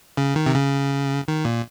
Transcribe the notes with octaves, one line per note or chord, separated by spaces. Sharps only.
C#3
D#3
C3
C#3
D#3
A#2